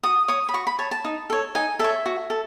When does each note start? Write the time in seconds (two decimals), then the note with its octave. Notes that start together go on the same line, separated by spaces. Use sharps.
0.03 F#4 D#6
0.28 C#5 D#6
0.49 B5
0.54 F#4 C#6
0.67 B5
0.79 C#5 A5
0.91 A5
1.05 D#4
1.30 A4 C#5
1.55 D#4 G#5
1.79 A4 C#5 E5
2.06 F#4
2.30 A4